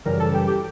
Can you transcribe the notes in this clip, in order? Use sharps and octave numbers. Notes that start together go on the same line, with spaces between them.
F#2 C#3 E3 G3 A#4
A4
G4
G4